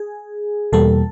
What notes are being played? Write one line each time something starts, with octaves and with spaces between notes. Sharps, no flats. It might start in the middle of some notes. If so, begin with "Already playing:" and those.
Already playing: G#4
E2 B2 G3 A#3 A4